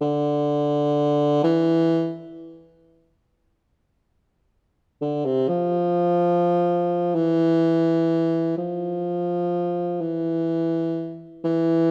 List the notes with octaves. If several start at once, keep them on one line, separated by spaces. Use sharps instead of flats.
D3
E3
D3
C3
F3
E3
F3
E3
E3